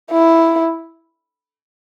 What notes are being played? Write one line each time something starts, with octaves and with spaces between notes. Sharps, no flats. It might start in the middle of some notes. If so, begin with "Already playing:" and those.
E4